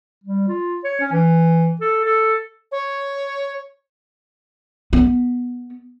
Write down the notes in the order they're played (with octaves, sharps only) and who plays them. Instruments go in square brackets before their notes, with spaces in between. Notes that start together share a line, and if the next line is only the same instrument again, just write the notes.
[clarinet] G3
F4
C#5
C#4
E3
A4
A4
[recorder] C#5
[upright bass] B3